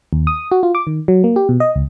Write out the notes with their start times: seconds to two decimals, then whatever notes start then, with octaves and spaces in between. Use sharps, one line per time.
0.13 D#2
0.27 D#6
0.52 F#4
0.63 F4
0.75 D6
0.87 D#3
1.08 F#3
1.24 A#3
1.36 G4
1.49 B2
1.60 D#5
1.75 C#2